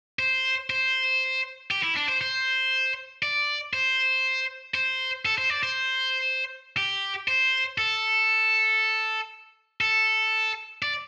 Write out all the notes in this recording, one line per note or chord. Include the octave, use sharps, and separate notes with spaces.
C5
C5
G4
E4
D4
C5
C5
D5
C5
C5
A4
C5
D5
C5
G4
C5
A4
A4
D5